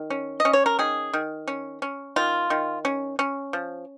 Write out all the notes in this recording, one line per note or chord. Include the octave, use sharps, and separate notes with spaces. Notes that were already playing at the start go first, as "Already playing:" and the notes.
Already playing: D#3
C#4
D#5
C#4
C#5
A#4
D#3 G#4
D#3
C#4
C#4
D#3 F4
D#3
C#4
C#4
F3